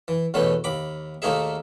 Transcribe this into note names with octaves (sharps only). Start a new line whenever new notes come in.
E3
E2 B2 A3 C#4 B4
D#2 B5 D6
D#2 A3 A#3 D#4 G#4 E5